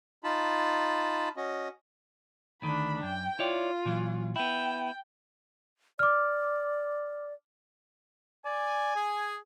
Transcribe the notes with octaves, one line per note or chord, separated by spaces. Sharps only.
D#4 F4 A5 B5
C#4 F#4 D#5
D2 D#3 A3 D4 B5
F#2 G5
E4 F4 C#5 D5
A#2 E3 F#3
B3 E4 G5
D5 D6 F6
D5 G#5
G#4